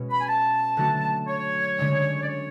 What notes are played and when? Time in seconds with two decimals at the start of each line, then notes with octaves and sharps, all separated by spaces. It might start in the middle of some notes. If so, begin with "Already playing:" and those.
Already playing: B2 G#3 C#4
0.10 B5
0.20 G#5
0.27 A5
0.77 D3 F#3 A3 D4 F#4
1.28 C#5
1.78 D3 G#3 C#4
2.23 D5
2.28 C#5